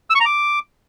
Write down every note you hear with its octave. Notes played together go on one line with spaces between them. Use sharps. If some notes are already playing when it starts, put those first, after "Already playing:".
E6
C#6
A#5
D6